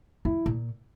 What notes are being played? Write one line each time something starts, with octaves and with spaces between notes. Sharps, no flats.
F2 E4
A#2